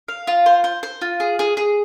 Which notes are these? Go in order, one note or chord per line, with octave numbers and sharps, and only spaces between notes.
F5
F4
C5
C5
C5
F4
G#4
G#4
G#4